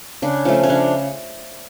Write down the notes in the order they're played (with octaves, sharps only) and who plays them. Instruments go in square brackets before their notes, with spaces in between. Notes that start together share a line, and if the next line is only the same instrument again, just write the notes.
[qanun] C#3 D4
F3 A3 C#4
C#4
C#3 D4